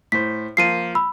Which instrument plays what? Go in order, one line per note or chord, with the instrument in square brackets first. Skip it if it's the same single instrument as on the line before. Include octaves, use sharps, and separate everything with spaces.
[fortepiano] A2 C5 [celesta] B6
[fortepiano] F3 A#3 [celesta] C7 D#7
[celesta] B5 E6